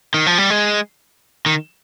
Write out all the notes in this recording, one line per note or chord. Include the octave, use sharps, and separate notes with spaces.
D#3
F3
G3
G#3
D#3